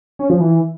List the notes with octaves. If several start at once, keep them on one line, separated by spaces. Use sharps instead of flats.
C#4
F3
E3